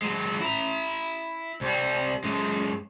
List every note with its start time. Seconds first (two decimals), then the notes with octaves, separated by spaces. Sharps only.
0.02 F#3 G#3
0.40 E4 A#5
1.61 C2 G3
2.24 F#2 G#3